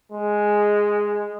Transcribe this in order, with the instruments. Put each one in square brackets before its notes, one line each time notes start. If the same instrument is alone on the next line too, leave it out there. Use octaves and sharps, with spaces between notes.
[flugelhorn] G#3